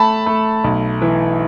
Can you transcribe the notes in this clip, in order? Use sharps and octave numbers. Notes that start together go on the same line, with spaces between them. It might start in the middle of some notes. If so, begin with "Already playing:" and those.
Already playing: A3 A5 B5
A3
B1
E3